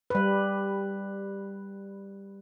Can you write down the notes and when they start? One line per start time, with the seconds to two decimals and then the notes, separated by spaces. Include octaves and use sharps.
0.10 G3 B4